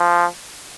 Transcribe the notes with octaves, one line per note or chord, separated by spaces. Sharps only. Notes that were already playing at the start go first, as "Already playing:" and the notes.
Already playing: F3